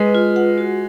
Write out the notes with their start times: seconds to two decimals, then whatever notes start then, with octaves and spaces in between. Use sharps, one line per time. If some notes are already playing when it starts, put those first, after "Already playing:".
Already playing: G#3 B4
0.15 F4
0.36 F#5
0.58 F#4